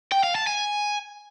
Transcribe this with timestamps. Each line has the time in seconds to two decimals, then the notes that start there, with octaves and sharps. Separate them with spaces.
0.12 G5
0.24 F5
0.35 A5
0.47 G#5